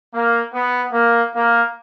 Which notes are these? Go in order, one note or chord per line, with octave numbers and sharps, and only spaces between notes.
A#3
B3
A#3
A#3